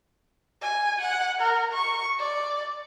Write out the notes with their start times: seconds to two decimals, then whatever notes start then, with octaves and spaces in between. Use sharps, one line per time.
0.62 G#5
1.01 F#5
1.40 A#4
1.73 C#6
2.19 D5